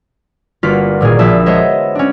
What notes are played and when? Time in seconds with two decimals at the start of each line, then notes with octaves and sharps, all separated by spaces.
0.63 G1 A#3 F4 F#4 B6
1.01 G#1 A#2 A#3 G#4
1.19 A#1 E5 A5 D#6 B6
1.46 G#3 B3 C5 C#5 D#5 E5
1.95 C#4 D4